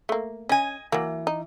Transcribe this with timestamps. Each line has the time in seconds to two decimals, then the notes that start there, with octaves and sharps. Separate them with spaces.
0.09 A3 A#3
0.49 C#4 D#5 G#5
0.92 E3 F#3 A#3
1.27 D#4